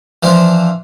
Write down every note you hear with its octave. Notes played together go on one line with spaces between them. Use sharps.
E3 F3 D4 F4